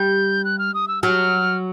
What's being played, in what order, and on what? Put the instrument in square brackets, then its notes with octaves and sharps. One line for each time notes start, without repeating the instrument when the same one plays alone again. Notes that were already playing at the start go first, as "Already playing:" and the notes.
Already playing: [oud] G3 [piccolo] G6
[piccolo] F#6
F6
D#6
E6
[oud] F#3 [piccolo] F6